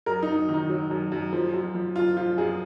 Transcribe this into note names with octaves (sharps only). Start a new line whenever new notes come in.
F#2 A#4
D#4
F#2
D#3
D#4
F#3
F#2
F#2
F3
F#2
F3
F#2 F4
F3 F4
F#2 G#4